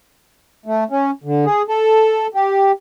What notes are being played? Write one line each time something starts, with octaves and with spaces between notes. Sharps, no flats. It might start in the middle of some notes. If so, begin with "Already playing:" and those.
A3
C#4
D3
G#4
A4
G4